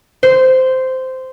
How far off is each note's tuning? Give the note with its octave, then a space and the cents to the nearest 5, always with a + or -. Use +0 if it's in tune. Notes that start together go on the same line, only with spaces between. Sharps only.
C5 -10